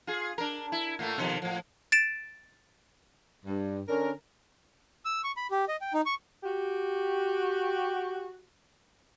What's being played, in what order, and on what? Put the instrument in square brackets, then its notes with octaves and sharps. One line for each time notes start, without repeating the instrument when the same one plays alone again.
[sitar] F4 G#4
D4 A#4
E4
A2 A3 A#3
B2 D#3 F3
A2 F3
[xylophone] A6 D7 E7
[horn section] G2
D3 C#4 D4 A#4
[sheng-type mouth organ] E6
C#6
B5
G4
D#5
G5
D#4
C#6
[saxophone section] F#4 G4